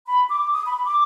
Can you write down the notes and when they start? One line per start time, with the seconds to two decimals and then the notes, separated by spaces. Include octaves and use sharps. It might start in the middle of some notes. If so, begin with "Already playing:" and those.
0.07 B5
0.30 D6
0.52 D#6
0.66 B5
0.85 D6